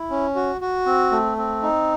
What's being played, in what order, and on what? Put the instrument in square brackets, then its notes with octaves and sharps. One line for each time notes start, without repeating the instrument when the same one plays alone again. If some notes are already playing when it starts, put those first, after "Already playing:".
Already playing: [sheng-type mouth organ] E4
C#4
F#4
F#4
C4
A3
C4
D#4